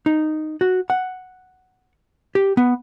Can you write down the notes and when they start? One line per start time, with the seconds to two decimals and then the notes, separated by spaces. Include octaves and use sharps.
0.06 D#4
0.61 F#4
0.90 F#5
2.35 G4
2.57 B3